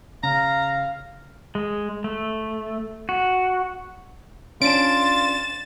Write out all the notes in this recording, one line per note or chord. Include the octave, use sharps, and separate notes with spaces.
C#3 F5 A#5
G#3
A3
F#4
C#4 D4 F4 A6 D7 E7